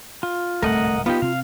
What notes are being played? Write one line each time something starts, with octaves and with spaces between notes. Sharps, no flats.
F4
D1 C2 G#2 A3 A#4 D#5 F#5
B3 D#4 F4 G4
C3 C4 F5